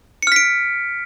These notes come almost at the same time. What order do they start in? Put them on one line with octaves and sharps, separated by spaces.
C#7 F6 B6 D7